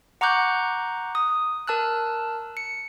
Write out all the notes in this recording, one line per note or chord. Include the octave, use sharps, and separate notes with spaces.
F#5 A#5 C#6 D6 F#6 G6
D#6
A#4 A5 E6 F#6
C#7